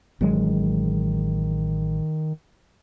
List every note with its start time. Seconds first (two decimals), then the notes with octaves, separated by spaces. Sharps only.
0.21 A1 D#3 F#3 G#3